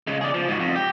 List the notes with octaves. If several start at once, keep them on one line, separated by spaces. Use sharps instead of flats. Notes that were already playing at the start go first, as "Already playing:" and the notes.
C#3 G#3
G#4 D5
F3
G#2 F#4
F2
G4